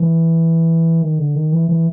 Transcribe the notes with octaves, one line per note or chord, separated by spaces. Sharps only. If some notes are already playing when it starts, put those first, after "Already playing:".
Already playing: E3
D#3
D3
D#3
E3
E3